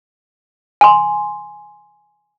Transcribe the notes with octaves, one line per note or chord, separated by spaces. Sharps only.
G#5 C6